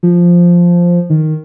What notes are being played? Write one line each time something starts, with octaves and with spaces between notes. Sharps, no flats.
F3
D#3